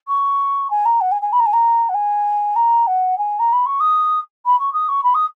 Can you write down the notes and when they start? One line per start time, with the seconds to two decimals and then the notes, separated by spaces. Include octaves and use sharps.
0.08 C#6
0.71 G#5
0.86 A#5
1.01 F#5
1.12 G#5
1.22 G#5
1.33 B5
1.40 A#5
1.46 G#5
1.53 A#5
1.89 F#5
1.94 G#5
2.56 A#5
2.87 F#5
3.18 G#5
3.39 A#5
3.53 B5
3.66 C#6
3.80 D#6
4.46 B5
4.59 C#6
4.73 D#6
4.89 C#6
5.04 B5
5.15 D#6